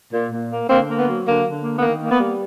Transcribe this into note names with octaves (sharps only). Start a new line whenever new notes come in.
A#2
A#2
A#3
D3 A#3 C4
A#3
B3
F#3
D3 A#3
D3
A#3
B3
D#3 A#3
A#3
B3
G3